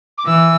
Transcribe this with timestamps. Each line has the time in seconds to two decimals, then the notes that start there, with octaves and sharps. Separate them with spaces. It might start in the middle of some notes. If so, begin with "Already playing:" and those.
0.18 D6
0.26 E3 E6